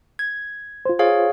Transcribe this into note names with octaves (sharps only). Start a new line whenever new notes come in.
G#6
F4 C5
G#4 C#5 F5